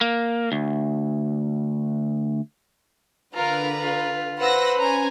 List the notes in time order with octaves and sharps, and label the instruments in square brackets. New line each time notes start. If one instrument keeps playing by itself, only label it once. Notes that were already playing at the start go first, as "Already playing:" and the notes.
[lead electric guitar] A#3
D2
[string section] D3 B4 [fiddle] F4 A#4 [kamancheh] A#5
[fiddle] F4
[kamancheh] B4 C5 [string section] F#5 E6 A#6
[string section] C#4 G#5 [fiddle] A#5